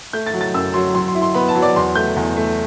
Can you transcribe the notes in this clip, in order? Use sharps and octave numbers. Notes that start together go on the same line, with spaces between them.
A3 G6
A6
F#3
A6
F#2 E6
F#3 C6
F#3 C6
C6
E4
C6
B3 B5
A5
F#3
D5
E2 C6
A3 G6
E2
A3